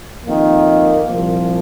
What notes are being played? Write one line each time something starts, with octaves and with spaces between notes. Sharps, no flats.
F2 D#3 A#3
C2 A#2 F3